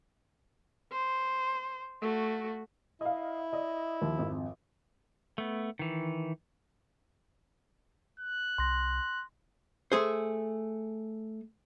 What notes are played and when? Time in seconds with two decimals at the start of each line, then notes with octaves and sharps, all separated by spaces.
0.91 C5
2.02 A3 F#4
3.01 E4 D#5 F5
3.52 D5 D#5
4.02 D#2 F3
4.19 G#1 F2
5.38 A3 B3
5.79 D#3 E3
8.20 F#6
8.58 C2 C6 A#6
9.92 A3 G#4 C5